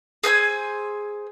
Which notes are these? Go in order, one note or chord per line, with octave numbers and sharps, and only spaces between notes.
G#4 C5 G#5 E6